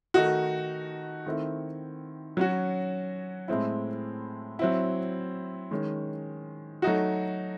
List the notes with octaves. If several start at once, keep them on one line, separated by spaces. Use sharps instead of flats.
D#3 A3 D#4 F#4
D#3 A3 C4 E4
F#3 C#4 F#4
A2 G#3 C4 E4
F#3 C4 E4
D#3 G#3 C#4
F#3 A3 D#4 F#4